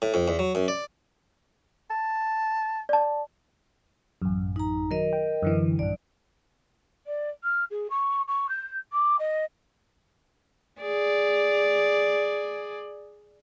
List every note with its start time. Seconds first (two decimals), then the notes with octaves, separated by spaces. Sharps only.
0.02 A2
0.14 F2
0.28 E2
0.39 F#3
0.55 F#2
0.68 D5
1.90 A5
2.89 D5 A5
4.22 A1 F#2
4.56 D#4 A#5
4.91 D#3 F#3 A#4 D#5
5.13 G5
5.42 F#2 D3 E3
5.79 A#1 G2 D5
7.06 D5
7.43 F6
7.70 G#4
7.90 C#6
8.28 C#6
8.49 G6
8.92 D6
9.19 D#5
10.81 G#4 D5